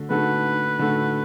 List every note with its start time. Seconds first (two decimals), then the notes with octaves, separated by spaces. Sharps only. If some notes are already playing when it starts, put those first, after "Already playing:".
Already playing: D3 A3 F#4
0.10 D3 A3 F#4 A4 B4
0.79 D3 A3 F#4 A4